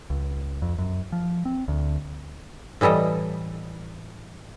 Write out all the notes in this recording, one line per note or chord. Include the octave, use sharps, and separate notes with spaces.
C#2
F2
F#2
F3
C4
D2
A2 E3 G3 A4 D#5